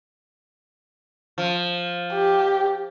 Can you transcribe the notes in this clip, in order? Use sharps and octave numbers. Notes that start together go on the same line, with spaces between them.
F3
G4